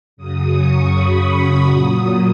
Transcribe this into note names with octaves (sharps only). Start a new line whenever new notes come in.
F#2 C#3 F#3 D#6
C#6
B5
A#2 F#3 D#6